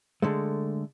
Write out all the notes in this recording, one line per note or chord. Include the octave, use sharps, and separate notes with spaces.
D3 G#3 A3